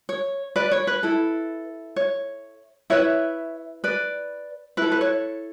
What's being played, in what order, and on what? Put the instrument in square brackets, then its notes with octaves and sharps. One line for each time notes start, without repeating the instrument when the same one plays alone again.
[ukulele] C#5
B4 D5
C#5
B4
E4 A4
C#5
E4 B4 C#5 E5
B4 D5
E4 A4 B4
B4
C#5